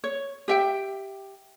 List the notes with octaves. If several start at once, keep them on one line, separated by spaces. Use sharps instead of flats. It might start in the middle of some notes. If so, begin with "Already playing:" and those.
C#5
G4 E5 G5